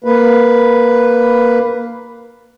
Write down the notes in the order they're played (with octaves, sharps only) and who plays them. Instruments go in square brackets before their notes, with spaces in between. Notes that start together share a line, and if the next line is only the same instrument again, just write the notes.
[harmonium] A#3 B4